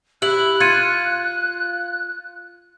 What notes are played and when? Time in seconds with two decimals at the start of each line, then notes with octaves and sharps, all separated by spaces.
0.22 E4 G4 F#6 F#7
0.60 F4 G#6 C#7 D#7